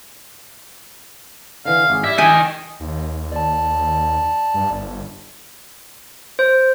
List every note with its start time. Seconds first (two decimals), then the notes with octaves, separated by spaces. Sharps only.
1.65 D3 E3 F5
1.90 G#1 G#4
2.04 E4 G4 D5 E5
2.18 D#5 G5 G#5
2.80 D#2
3.32 D5 A5
4.54 G2
4.70 G1
6.39 C5